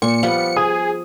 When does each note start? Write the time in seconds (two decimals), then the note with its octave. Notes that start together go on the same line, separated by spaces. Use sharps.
0.02 A#2 C#6 C#7
0.23 F3 G3 B3 F5
0.57 G#4 D#6